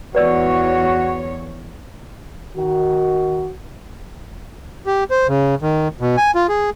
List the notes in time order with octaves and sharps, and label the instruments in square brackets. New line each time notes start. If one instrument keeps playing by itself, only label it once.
[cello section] E2 C#5 [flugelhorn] F#4 [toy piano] B4 D5 E6
[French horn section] D#3 F#4
[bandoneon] G4
C5
C#3
D#3
B2
G#5
F4
G#4